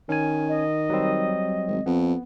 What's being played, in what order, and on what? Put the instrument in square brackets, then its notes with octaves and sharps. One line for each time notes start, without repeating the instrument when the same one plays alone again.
[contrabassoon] D#3 [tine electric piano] C#4 G#5
[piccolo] D#5
[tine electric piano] F#3 G3 C4
[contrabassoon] G#1
[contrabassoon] F2 [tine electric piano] B3